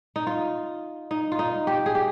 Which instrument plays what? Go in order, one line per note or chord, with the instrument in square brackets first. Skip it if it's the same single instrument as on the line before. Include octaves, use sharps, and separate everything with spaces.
[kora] D#4
F4
D#4
F4
D#4
G4
G#4
G4